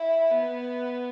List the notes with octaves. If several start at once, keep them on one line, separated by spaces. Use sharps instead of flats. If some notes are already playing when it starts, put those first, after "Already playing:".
Already playing: E4
B3